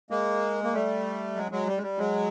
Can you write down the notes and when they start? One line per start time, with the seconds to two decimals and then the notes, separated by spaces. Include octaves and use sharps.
0.11 G#3 A#3
0.64 A#3
0.73 G3 A3
1.36 F#3 G#3
1.51 F#3 G#3
1.67 G3
1.78 G#3
1.83 G3
1.98 F#3 G#3